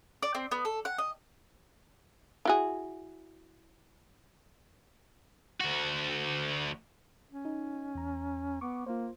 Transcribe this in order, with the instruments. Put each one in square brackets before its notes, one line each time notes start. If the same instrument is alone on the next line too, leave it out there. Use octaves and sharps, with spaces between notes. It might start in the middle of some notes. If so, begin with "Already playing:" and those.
[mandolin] D5
C4
B3
A4
F#5
D#5
[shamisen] E4 F#4 G#4
[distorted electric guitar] D2 F#4
[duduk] C#4
[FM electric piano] D#4
E2 A#5
[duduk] B3 [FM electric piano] C#6 D6
[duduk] A#3 [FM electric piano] F4 C5